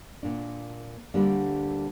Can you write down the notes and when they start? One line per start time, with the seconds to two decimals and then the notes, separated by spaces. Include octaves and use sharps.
0.23 A#2 A#3 D4
1.14 D2 D3 G3 A#3 D4